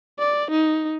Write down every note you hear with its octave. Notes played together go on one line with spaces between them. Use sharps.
D5
D#4